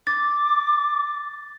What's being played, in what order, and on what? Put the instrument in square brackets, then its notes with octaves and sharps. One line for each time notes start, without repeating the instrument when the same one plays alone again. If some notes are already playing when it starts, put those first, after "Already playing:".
[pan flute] D6 [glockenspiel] A6